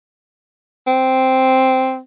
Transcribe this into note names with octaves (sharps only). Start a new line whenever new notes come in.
C4